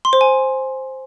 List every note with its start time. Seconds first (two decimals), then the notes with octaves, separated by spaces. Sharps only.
0.05 C6
0.13 C5
0.21 G#5